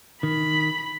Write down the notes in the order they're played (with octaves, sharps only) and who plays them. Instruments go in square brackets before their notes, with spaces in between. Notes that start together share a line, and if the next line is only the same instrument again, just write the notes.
[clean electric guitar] D#3 [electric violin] B5